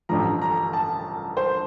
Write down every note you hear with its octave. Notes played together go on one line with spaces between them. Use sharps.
A1 G2 D3 F3 A#5
A#5
A5
C5